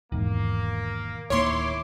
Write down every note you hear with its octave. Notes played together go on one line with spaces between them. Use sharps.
E1 E2 G#2 D#3 A#3
D1 D#3 A#3 E4 C#5 C6 D6